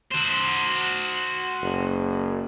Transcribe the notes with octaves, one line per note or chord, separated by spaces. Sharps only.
F#4 C5
F#1